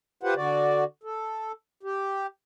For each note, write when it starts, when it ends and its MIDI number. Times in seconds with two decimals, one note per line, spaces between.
0.23 0.34 65
0.23 0.34 67
0.23 0.34 71
0.23 0.34 72
0.23 0.34 78
0.36 0.84 50
0.36 0.84 66
0.36 0.84 74
1.04 1.52 69
1.83 2.27 67